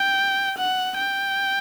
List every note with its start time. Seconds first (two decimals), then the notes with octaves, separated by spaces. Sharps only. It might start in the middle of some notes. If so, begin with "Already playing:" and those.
Already playing: G5
0.58 F#5
0.98 G5